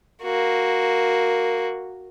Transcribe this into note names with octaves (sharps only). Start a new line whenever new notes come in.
A#3 F#4